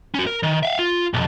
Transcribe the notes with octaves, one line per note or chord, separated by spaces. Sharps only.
C#4 F#4
A#4
D#3
E5 F5
F4
B1 F2